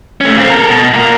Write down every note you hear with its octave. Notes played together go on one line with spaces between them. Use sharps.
A3 C#4
A#2 C4
A4 A#4
B2
A#2 A#4